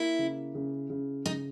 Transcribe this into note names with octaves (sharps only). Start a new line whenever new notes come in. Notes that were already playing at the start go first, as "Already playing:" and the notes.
Already playing: A#3 E4
C#3
C#3
C#3
C#3 D#4